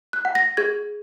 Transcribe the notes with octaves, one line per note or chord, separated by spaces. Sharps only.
F#6
F#5
A#6
G#4 G#6